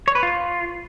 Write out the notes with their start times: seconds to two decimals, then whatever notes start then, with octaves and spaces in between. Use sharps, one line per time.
0.08 C#5
0.15 B4
0.23 F4